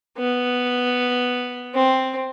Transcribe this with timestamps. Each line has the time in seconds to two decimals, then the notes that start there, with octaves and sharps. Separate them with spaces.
0.18 B3
1.75 C4